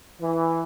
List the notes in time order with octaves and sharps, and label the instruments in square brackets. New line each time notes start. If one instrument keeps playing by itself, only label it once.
[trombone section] E3